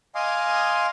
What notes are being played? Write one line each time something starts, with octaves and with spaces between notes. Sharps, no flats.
D#5 F5 G#5 C6 D6 D#6